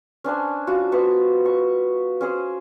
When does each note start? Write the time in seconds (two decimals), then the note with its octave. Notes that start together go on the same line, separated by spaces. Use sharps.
0.24 C#4 D4 C5 G#5
0.67 G3 F4 F#4
0.92 B3 B4 C5 C#6
1.45 C#6
2.21 C#4 G#4 C5